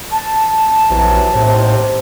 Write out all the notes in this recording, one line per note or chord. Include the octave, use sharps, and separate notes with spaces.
A5
A#1 C3 E3 F#3
D#2 A2 C3 C5